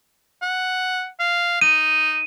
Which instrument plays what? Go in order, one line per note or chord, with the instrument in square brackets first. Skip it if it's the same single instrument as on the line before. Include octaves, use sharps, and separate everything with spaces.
[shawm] F#5
F5
[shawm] D#4 [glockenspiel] D#7